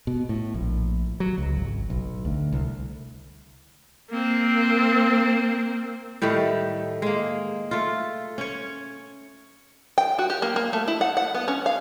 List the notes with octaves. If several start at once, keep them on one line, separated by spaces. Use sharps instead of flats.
B2
A2
A#1
F#3
C#2
G#1
B1
D2
C2
A#3 C4
A2 D#3 G3 A3
G#3 A#3
A3 F4
C#4 C#5
G5
F#4
G4
A#3
A#3
A3
E4
F#5
F#5
B3
C#4
F5